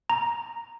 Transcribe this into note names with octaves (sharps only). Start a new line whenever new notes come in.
A#5